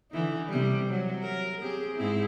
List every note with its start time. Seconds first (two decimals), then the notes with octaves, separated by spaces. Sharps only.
0.11 D3 E3 D#4
0.49 C3 G3
0.89 F#3
1.22 A#4
1.61 C4 G4 G#4
1.96 G#2 C4 E4